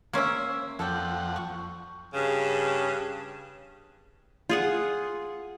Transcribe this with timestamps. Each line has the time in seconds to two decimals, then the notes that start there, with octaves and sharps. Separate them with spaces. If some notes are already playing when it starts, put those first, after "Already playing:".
0.13 A#3 C#4 C5 E5
0.79 F2 F3 A4 D5 F#5 G5
1.36 C#6
2.13 G2 C#3
4.49 F4 G#4 F#5